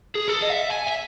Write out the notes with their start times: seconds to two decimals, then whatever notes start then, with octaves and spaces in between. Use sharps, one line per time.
0.15 G#4
0.28 A4
0.42 D#5
0.49 E5
0.71 G#5
0.88 E5